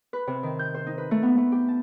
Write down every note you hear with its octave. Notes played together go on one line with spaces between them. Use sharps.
B4
C3
D#3
G6
C5
D#4
B4
A3
B3
A3
G4
A5